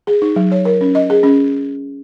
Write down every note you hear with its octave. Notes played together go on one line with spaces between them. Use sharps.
G#4
D#4
F#3
C#5
A#4
C#4
D#5
G#4
C#4